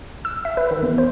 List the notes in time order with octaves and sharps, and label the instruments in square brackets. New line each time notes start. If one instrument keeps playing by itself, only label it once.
[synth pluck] E6
E5
B4
D#3
E2
C5